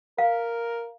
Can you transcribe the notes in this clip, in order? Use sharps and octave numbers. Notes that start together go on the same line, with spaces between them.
A#4 F5